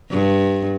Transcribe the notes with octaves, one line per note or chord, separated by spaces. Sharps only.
G2